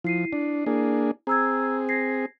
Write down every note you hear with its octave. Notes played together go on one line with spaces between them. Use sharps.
F3 E4 C7 D#7
D4
A#3 D4 G#4
C4 G#4 A#5 E6 G#6
G#6 A#6 C7